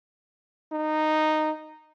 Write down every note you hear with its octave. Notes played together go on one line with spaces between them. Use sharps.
D#4